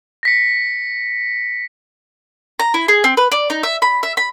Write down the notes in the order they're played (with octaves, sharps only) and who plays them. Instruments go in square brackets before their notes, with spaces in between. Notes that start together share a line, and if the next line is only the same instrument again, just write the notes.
[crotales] A#6 B6 C#7
[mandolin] A#5
E4
G#4
C4
B4
D5
D#4
E5
B5
E5
B5